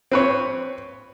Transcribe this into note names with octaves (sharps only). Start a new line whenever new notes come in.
C4 B4 C#5